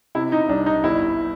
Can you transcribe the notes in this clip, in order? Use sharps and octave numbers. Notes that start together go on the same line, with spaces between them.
C3 E4
D#4
C2 D4
D#4
G1 E4